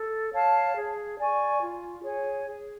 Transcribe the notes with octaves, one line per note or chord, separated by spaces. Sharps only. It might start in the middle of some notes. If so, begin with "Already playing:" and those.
Already playing: A4
C#5 F5 A5
G#4
D5 G#5 C#6
F4
G#4 C#5 G#5
G#4